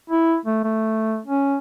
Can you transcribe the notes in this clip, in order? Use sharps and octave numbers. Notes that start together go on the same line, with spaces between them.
E4
A3
A3
C#4